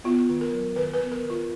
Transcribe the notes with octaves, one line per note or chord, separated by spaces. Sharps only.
B3 F4
D#3
A#4
F#3
D#3 B4
B4
B3
A#4
D#3
F4